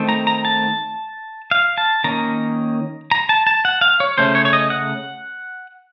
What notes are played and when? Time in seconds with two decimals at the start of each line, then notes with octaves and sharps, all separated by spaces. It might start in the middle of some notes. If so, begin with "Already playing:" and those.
Already playing: D#3 A3 C4
0.09 A#5
0.27 A#5
0.45 A5
1.51 F5
1.78 A5
2.04 D#3 A#3 C#4 A#5
3.11 A#5
3.29 A5
3.47 A5
3.65 F#5
3.81 F5
4.00 C#5
4.18 C#3 A3 C#4 C5
4.35 C#5
4.45 C#5
4.53 D#5
4.70 F#5